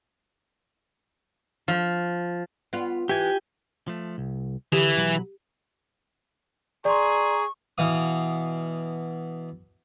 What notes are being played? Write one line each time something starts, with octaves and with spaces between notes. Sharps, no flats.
F3
B3 F4
E3 G4 G#5
F3 A3
C2
D3 E3 G4
B1 F#3 B5
G#4 D5 A#5 C6 C#6
B2 E3 F5 D#6